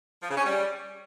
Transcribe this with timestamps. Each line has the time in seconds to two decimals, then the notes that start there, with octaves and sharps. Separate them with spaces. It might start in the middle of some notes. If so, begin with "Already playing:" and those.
0.23 F3
0.30 C#3
0.37 C#4
0.44 G3